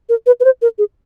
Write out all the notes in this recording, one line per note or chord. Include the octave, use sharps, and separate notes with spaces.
A#4
B4
B4
C5
A#4
G#4